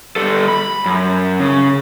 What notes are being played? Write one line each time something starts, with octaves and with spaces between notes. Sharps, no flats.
G3 A4
B5
F#2
C#3